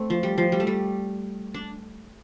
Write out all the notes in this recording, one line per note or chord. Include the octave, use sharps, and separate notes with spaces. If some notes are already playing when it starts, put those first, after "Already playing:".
Already playing: A3 C4
F3
G3
F3
G3
A3
G3
D4